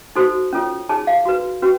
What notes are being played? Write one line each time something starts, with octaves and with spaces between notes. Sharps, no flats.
D#4 F#4 A4 C5
C#4 F4 A4 C#5
D#4 G#4 C#5 A5
F5
F#4 B4
C#4 F#4 B4